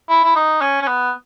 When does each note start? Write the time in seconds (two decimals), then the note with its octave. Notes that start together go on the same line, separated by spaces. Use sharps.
0.09 E4
0.24 E4
0.36 D#4
0.61 C#4
0.82 C#4
0.87 B3